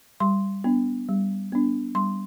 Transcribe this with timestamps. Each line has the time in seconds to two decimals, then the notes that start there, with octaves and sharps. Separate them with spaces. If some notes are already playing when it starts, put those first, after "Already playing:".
0.20 G3 C6
0.64 B3 D4
1.09 G3
1.52 B3 D4
1.95 G3 C6